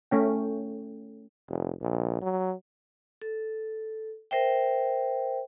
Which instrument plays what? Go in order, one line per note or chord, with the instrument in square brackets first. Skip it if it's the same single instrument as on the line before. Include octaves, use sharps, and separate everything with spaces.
[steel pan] A3 C#4 G5
[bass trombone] F1
A#1
F#3
[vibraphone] A4
A#4 C5 E5 G5